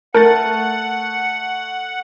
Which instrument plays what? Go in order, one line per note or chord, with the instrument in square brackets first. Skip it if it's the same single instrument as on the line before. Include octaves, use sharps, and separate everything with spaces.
[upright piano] A3 [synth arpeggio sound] A#4 G6 A6 [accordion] F#5 [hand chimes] A5